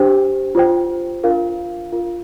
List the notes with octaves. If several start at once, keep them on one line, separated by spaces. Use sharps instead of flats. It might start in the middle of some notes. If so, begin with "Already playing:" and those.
Already playing: D4 G4 C5 G5
F4 C5 G5
D4 F4 A#4 F5
F4 A#4 F5